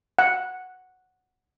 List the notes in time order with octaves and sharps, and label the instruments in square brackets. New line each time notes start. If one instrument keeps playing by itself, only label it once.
[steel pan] F#5